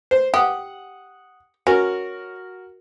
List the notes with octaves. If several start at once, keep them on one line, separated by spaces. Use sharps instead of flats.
C5
G4 F#5 D#6
C#4 F#4 A#4